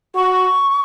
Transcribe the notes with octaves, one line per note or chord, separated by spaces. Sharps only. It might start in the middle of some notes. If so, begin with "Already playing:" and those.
F#4 C#6